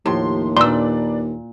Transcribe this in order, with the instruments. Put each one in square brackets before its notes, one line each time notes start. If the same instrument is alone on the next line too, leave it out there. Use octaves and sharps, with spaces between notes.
[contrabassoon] D#2 [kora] A2 [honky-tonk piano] F3 G4 C6
[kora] A#2 [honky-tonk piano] D4 B4 D5 [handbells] C6 E6